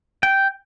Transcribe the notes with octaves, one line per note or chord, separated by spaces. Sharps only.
G5